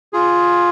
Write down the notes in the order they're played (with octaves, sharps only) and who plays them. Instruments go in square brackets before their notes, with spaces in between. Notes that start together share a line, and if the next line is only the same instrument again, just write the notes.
[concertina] F4 G#4